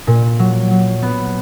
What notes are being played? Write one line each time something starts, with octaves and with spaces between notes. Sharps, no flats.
A#2
F#3
F#3
B3